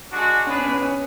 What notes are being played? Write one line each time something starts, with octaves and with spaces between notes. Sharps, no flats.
G#3 D4 F#4
C#4 D4 G#4 B4
B3
C#4
C#4